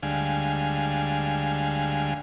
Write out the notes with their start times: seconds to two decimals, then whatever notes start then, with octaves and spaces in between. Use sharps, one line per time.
0.03 D2 D3 G3 G#3 F5 G#5